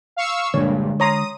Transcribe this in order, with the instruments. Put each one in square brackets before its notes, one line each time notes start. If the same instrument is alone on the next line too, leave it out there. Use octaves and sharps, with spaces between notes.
[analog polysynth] F5 C#6 E6
[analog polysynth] A#1 G2 A#2 [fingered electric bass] D3 G#3 [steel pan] C#5
[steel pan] C#5 A#5 C6 [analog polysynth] D#6